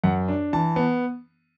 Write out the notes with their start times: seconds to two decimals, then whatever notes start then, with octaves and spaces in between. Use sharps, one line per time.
0.03 F#2 F#5
0.28 D4
0.53 E3 A5
0.76 B3